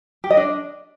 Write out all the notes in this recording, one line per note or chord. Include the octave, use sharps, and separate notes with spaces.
G4
D#5
D4